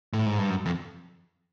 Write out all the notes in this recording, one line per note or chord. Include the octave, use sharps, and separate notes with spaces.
A2
G#2
G2
F#2
F2